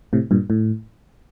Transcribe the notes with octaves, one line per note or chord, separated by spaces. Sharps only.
A2 C3
G2 A#2
A2